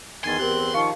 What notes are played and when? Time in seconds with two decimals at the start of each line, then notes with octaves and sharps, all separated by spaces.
0.24 E2 D#3 G#5 C6 G#6 A6
0.39 E2 C4 G4 A#4 F#6
0.74 D#3 F3 F5 C#6